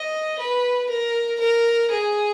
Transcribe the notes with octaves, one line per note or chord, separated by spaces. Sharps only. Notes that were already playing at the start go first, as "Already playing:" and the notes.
Already playing: D#5
B4
A#4
A#4
G#4